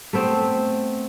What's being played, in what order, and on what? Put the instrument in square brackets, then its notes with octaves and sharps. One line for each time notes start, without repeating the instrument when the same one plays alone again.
[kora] A3 B3 C4